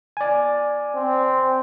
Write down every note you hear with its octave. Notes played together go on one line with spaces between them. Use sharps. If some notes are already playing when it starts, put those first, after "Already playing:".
D5 G#5
C4